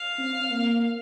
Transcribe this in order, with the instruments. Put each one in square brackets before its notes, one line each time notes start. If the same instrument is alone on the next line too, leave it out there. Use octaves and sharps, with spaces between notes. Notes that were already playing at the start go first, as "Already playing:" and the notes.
Already playing: [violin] F5
[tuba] C4
A#3